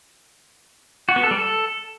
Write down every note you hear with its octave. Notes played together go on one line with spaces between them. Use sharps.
F#4
B3
A4
G3
A4